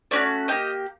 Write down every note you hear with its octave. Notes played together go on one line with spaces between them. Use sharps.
A3 C#4 F#4 D5
A#3 D4 G4 D#5